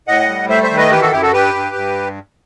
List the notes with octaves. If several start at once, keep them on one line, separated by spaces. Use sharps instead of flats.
A2 D#5 F#5
G3
A3 C5 E5
C5 E5
D#3
B4 D#5
E3 G4 B4
F#4 A4
F#2 E4 G4
F#4 A4
G2 G4 B4
G2
G2